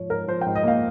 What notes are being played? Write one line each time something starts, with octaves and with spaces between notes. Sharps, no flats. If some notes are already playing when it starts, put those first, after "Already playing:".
Already playing: G#2 F3 C#5
G#2 A#4
F3 C5
G5
G#2
D#5
A#3 F5